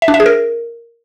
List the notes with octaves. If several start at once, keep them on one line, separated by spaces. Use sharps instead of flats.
E5
D4
E5
G#4
A#4